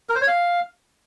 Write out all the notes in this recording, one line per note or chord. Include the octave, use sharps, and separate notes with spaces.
A#4
C5
C#5
F5